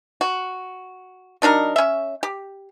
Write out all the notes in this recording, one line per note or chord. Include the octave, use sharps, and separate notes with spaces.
F#4
F#3 D4 D#4 A#4
C#4 E5
G4